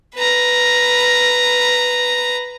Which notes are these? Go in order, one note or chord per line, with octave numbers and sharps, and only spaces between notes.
B4 A#5